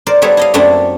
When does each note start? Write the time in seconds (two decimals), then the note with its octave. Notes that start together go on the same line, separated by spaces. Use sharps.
0.07 A#4 C5 D5
0.22 G3 B3 E4 A4 C#5 E5
0.37 E4 D#5 F5
0.54 F#2 A3 A#3 C4 D4 E4